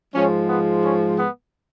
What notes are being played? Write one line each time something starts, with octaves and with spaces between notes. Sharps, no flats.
G#2 F3 G#3 C#4
B3
C#4
B3